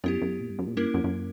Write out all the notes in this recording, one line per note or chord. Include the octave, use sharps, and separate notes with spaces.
F#2 B3 E4 G4
F#2
A#2
G2
F#2
A#2
G2 A#3 C#4 E4 A#4
F#2
F#2